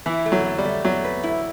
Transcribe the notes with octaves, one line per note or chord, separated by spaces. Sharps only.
E3 E4
A3
F#3
A3
G3
A3
F#3 A3
B4
E4